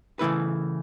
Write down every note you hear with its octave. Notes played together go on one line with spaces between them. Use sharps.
C#3 E3 A3 E4 B4